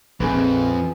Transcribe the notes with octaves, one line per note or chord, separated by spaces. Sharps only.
A#1 F2 F3 C4 G#4 A#4 B4